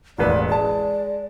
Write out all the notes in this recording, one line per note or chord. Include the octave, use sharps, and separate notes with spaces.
E1 A1 B4 D5
G#3 D5 A5